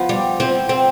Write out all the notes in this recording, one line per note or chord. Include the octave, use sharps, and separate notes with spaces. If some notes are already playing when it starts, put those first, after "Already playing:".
Already playing: F3 B3
G3
F3 C4
C4